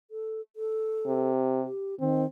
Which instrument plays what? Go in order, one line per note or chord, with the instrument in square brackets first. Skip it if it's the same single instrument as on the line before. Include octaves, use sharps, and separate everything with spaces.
[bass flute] A4
A4
[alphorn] C3
[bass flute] G4
[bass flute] D#3 [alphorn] C4